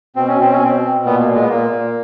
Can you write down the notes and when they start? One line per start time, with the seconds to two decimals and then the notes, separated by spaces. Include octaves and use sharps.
0.16 B2 C4
0.28 C#4
0.39 B2 C4
0.52 C#4
0.60 B2 C4
0.83 B2
1.05 A#2 B3
1.20 A#3
1.28 A#2
1.34 G#3
1.42 B3
1.49 A#2 A#3
1.71 A#2